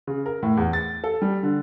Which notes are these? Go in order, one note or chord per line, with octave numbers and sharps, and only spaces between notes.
C#3
A#4
A2
E2
A6
A4
G3
D3